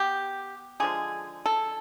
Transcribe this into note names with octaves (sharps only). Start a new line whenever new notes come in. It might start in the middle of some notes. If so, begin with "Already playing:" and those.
Already playing: B3 G4
D3 F3 G#3 G#4
A4